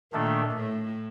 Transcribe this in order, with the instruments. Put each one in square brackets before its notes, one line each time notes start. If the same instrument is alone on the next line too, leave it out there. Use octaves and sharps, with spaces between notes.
[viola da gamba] A#2 [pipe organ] D#3 A3 D4 A4
[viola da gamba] A2